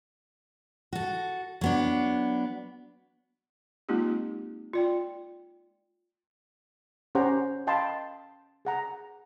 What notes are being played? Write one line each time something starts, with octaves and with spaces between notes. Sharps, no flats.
F#4 A4
F#3 B3 D4
G#3 A#3 C4 D#4 F4 G4
F4 D5 G5
C#4 G4 C5 F#5 A#5
D#5 F5 G5 A5 B5 C6
G#4 F#5 A#5